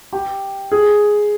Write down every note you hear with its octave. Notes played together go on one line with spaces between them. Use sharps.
G4
G#4